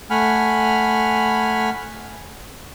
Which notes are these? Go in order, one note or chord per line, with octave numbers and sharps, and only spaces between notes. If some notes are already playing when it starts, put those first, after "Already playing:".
A3 F#5 G#5 B5 F6